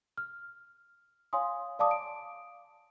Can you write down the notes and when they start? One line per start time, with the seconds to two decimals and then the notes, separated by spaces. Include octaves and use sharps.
0.18 F6
1.33 C#5 F5 G#5 C6 D#6
1.79 D5 F5 A5 D6 D#6
1.91 D7